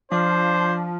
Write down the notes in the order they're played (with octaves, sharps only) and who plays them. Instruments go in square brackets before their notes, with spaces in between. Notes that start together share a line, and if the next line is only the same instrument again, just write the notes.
[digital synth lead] F3 [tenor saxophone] D4 [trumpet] C5